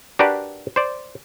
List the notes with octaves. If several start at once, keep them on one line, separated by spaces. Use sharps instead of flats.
D4 F#4 G4 A#4 B4 D5
C5 D5